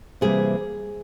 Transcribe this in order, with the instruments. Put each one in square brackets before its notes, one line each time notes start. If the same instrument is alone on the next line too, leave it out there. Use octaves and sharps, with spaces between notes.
[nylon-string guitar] C3 E3 G3 A#3 G#4